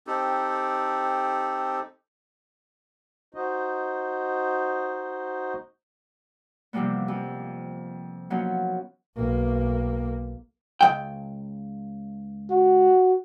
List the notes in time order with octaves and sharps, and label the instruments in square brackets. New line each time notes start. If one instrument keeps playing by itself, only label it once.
[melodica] C4 D#4 G4 A4
[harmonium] D#4 F#4 C5 D#5
[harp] C3 E3 F3 G3 A#3 B3
F2
F3 F#3 A#3 B3 C#4 D#4
[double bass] B1 A#3
[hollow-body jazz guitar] C#2 F3 G5
[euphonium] F#4